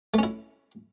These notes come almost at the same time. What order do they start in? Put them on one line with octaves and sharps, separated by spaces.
A3 C#4 E4